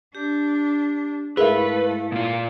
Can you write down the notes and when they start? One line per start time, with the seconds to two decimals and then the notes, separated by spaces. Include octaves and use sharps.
0.15 D4 G4
1.37 G#2 A3 E4 G#4 A#4 B4 E5 F5
2.12 A#2 F4